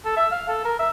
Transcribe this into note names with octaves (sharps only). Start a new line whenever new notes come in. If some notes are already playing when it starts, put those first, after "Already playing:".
A4
E5
F5
A4
A#4
E5